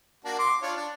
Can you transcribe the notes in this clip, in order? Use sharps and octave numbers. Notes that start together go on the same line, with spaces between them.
A#3 D4 F#4
C6 D6
D4 F4 C#5
D4